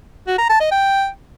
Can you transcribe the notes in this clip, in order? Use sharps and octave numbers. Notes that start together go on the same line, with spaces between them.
F#4
A#5
A5
D#5
G5